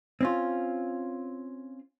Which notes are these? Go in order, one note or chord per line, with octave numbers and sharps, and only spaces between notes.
C4 C#4 F4